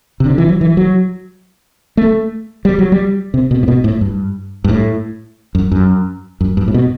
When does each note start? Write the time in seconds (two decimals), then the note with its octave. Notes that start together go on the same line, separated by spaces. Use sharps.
0.20 C3
0.26 D3
0.38 E3
0.48 F#3
0.61 E3
0.77 F#3
1.97 A3
2.65 G3
2.79 F#3
2.92 G3
3.34 C3
3.51 B2
3.63 A2
3.68 B2
3.84 A2
4.01 G2
4.64 G2
4.69 A2
5.55 F#2
5.72 F#2
6.41 F#2
6.57 G2
6.68 A2
6.74 B2